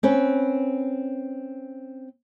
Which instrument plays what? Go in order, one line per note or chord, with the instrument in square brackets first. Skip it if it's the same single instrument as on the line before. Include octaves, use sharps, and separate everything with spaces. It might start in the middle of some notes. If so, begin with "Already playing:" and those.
[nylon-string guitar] C4 C#4 B4